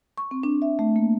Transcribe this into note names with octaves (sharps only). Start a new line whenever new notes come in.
C#6
C4
D4
E5
A3
A#3